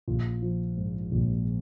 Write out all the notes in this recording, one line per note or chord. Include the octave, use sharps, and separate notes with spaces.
A#1 F4
F3
G#2
A#1